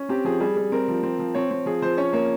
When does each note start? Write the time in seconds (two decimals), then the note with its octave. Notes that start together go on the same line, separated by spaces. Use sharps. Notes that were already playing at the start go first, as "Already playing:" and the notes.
Already playing: C#4
0.09 C4 G4
0.25 F3 G#4
0.40 G3 G#4
0.56 G3
0.72 C4 A#4
0.88 F3
1.03 C4
1.19 F3
1.35 C4 C#5
1.51 C4
1.66 F3 G#4
1.82 F3 C5
1.97 C#4 C#5
2.13 A#3 C#5